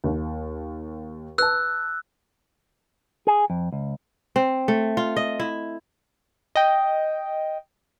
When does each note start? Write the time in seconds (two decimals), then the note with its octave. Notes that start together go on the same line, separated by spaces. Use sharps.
0.04 D#2
1.38 B4 A5 E6 F#6
3.27 G#4
3.50 F2
3.73 C#2
4.36 C4
4.68 A3
4.97 F4
5.16 D#5
5.40 E4
6.55 D#5 G5